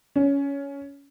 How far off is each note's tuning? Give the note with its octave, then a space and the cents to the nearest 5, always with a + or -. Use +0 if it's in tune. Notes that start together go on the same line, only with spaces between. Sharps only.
C#4 +15